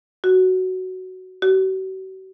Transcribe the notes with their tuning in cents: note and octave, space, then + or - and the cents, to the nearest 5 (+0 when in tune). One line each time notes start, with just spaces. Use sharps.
F#4 +10
F#4 +45